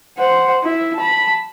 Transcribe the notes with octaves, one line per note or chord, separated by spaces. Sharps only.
C5 F#5
E4
A5 B5